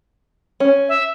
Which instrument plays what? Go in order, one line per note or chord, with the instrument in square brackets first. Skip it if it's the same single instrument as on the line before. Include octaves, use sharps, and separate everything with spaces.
[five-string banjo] C#4
[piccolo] E5